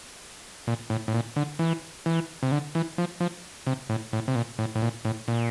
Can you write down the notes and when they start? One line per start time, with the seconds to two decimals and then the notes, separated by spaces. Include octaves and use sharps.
0.67 A#2
0.90 A2
1.08 A2
1.14 A#2
1.36 D3
1.59 E3
2.06 E3
2.43 C3
2.52 D3
2.75 E3
2.98 F3
3.20 F3
3.67 C3
3.89 A2
4.13 A2
4.28 C3
4.35 A#2
4.59 A2
4.75 A2
4.82 A#2
5.05 A2
5.28 A#2